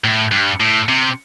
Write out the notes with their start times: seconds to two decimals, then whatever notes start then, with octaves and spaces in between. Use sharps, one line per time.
0.04 A2
0.32 G2
0.61 A2
0.89 C3